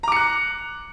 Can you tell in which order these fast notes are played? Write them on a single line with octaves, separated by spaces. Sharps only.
A#5 D6 C#7 F#6